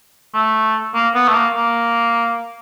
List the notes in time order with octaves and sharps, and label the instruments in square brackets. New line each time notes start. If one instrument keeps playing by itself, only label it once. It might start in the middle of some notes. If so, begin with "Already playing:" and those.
[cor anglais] A3
A#3
B3
A3
A#3
A#3